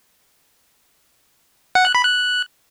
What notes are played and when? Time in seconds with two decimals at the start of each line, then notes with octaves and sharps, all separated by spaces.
1.75 F#5
1.85 F#6
1.95 B5
2.04 F#6